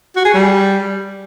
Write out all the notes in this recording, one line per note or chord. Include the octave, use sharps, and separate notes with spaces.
F#4
G#4
G3